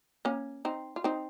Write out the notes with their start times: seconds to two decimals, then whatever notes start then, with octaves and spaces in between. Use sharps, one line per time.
0.25 A#3 C#4
0.65 C4 D#4
0.96 F4
1.04 C4 D#4